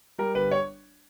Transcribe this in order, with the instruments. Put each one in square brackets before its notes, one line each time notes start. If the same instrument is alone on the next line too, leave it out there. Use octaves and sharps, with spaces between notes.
[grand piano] G3 A#4
G1 B4
C#5